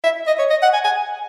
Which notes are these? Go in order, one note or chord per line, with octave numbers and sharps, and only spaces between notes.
E5
D#5
C#5
D#5
F#5
G#5
G#5